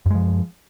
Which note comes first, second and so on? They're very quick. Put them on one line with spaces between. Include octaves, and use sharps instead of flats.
F#2 G#3 F3